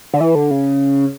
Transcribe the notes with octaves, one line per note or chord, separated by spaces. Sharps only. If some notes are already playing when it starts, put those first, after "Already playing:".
D3
E3
D3
C#3